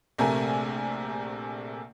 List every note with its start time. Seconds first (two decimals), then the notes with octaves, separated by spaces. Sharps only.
0.18 A#1 C3 A3 A#4 G#5